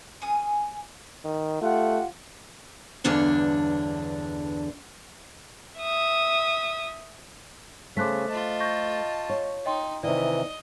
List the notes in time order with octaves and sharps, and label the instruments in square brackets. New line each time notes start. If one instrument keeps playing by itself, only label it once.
[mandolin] C#4 G#4 D#6
[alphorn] D#3
[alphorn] A3 [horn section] F4 G4 F#5
[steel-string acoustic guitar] E2 G2 D3 D4 C#5
[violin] E5 D#6
[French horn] C#3 [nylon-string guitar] A3 C5 [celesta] D6 F#6 B6
[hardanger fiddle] F4 A5 [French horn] D#5
[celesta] C#6 G6 A#6
[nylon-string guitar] C#5
[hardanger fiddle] D#4 [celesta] D#5 G5 C6
[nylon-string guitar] C3 D#3 [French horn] E3 [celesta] D5 [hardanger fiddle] D#5